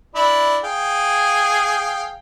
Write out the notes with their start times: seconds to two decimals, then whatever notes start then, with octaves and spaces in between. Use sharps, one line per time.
0.15 D4 E4 B5
0.64 G#4 F5 G5